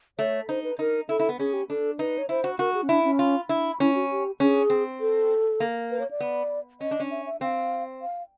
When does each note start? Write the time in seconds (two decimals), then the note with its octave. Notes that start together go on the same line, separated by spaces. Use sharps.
0.19 A3 C#5
0.49 D#4 C5
0.64 B4
0.79 D#4 A#4
1.09 E4 A4
1.19 E4
1.29 B3
1.39 C#4 G#4
1.53 G4
1.70 D4 A4
1.99 D#4 B4
2.18 C#5
2.29 E4 C5
2.44 F#4
2.59 F#4 A#4
2.74 G#4
2.83 C#4
2.89 D4 E4
3.04 C#4
3.19 F4
3.49 D4 E4
3.80 C#4 E4
3.95 F#4
4.10 G4
4.40 C#4 G#4
4.70 C4
5.00 A4
5.60 A#3
5.91 B4
6.00 C#5
6.11 D5
6.20 B3
6.81 C#4 D#5
6.91 D4
7.00 C#4
7.11 E5
7.26 E5
7.41 C4 F5
8.02 F5